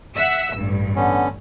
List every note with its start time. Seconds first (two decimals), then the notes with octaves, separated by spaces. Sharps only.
0.16 E5 F#5 E6
0.54 A1 G2
0.96 D3 B3 C#4